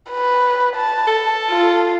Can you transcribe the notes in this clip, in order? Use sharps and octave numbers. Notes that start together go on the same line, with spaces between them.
B4
A5
A4
F4